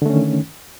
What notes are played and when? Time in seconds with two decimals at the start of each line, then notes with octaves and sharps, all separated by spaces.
0.02 D3
0.06 A3
0.10 C#4
0.14 D#3